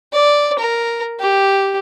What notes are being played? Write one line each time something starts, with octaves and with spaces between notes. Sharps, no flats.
D5
A#4
G4